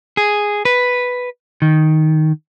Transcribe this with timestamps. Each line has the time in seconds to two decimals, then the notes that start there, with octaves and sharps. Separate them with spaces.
0.17 G#4
0.65 B4
1.62 D#3